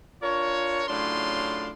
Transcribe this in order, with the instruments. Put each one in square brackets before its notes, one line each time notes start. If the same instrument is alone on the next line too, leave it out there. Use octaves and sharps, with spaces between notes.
[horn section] D4 F4 A#4 C#5
A2 C#3 F#3 D4 F4 C6